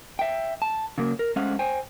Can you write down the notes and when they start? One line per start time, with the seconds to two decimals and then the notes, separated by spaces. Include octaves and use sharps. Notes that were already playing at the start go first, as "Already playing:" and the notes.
0.19 E5 G5
0.62 A5
0.98 C#3 F#3 A#3
1.19 A#4
1.36 G#3 A3 C#4 C5 F5 F#5
1.59 C5 G5 G#5